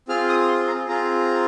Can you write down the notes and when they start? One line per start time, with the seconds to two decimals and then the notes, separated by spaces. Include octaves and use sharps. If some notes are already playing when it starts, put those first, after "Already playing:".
0.08 C4 F4 G#4 F6
0.29 D#6
0.48 C6
0.67 A#5
0.88 C4 F4 G#4 A#5